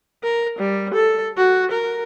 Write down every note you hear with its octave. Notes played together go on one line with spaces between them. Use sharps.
A#4
G3
A4
F#4
A#4